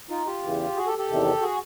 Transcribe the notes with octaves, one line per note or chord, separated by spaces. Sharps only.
D#4 F4
F4 G4
E2 C#3 E3
F#4 G#4
G4 A4
G4 A4
E2 C3 D#3
F#4 G#4